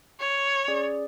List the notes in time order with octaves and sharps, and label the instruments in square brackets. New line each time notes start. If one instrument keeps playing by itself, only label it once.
[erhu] C#5
[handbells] C#4 G#4 D5